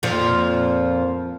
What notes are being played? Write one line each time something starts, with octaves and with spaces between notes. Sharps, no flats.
F2 A#2 F3